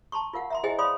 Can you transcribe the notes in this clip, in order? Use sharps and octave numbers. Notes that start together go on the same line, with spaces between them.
A5 A#5 C6 C#6
F4 A#4 F5 F#5
E5 A#5 C6
E4 G#4 C5 D#5 G5 G#5
C#5 D5 F5 B5 C6 D#6